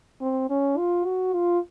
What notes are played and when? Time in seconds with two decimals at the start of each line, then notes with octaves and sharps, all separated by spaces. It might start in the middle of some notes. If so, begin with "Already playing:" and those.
0.21 C4
0.50 C#4
0.78 F4
1.06 F#4
1.34 F4